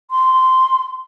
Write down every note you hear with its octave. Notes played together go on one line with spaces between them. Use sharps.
C6